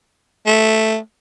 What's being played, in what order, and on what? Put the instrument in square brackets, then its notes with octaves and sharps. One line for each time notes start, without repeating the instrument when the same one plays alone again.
[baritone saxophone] A3